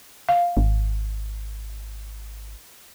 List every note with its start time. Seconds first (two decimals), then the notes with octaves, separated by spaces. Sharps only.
0.29 F5
0.57 G#1